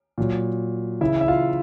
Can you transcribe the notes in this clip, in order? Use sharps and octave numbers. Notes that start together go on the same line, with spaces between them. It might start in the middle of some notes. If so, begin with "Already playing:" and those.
A#2 F#3
C#3 E3 E4 E5
E5
F4 F5